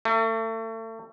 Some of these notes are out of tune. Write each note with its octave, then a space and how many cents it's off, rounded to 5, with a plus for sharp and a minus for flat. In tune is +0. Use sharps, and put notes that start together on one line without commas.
A3 +35